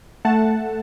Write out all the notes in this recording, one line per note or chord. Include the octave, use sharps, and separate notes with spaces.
A3 F#5 A5